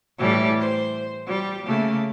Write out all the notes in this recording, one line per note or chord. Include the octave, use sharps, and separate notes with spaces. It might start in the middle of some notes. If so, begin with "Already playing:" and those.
A2 E3 G3
C5
G3
C#3 A3 A#3